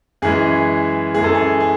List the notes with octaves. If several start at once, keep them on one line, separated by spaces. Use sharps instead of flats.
F#2 E3 G#3 G#4
F#2 E3 G#3 G#4
A4
G#4
G#4